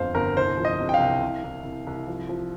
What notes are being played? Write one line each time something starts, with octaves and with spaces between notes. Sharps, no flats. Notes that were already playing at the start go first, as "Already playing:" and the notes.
Already playing: G1 F2 F3 C5 F5
G1 A#4
C2 C5
F3
D#5
C3
G5
F5
C2
C2
C2
C2
C2
F3
F3